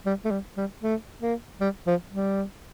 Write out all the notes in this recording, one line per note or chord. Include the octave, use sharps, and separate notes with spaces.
G3
A3
G3
G3
A3
A#3
G3
F3
G3